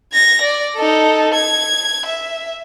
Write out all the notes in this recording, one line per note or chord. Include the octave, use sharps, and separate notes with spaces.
G#6 A#6
D5
D#4 A4
G#6
E5